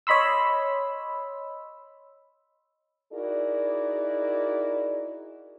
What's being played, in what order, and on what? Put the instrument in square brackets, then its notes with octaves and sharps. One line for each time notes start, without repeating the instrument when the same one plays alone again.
[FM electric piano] C#5 D#5 B5 C6 E6
[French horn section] D#4 E4 F#4 G#4 A#4 D5